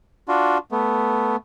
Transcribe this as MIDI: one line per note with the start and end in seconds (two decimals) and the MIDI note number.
0.28 0.58 62
0.28 0.58 65
0.28 0.58 66
0.71 1.36 57
0.71 1.36 59